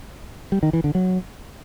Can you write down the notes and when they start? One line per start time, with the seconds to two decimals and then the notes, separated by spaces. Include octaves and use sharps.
0.52 G3
0.63 D#3
0.73 E3
0.84 D3
0.95 F#3